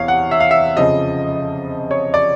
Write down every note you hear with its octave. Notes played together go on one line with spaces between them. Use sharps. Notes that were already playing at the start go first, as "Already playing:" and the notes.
Already playing: E2 C3 E3 C#5 F5
F#5
E5
F5
E5
F2 C#3 F3 D#5
C#5
D5